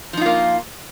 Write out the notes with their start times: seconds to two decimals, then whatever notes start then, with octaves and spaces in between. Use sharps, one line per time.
0.13 F3
0.17 D#4
0.21 F4
0.26 A#3